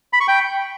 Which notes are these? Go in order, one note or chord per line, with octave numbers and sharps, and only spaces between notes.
B5
C#6
G5